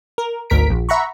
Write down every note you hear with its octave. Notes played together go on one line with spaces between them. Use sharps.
A#4
G#1 D2 A#4 B6 D7
A#1
E5 F#5 A#5 B5 C#6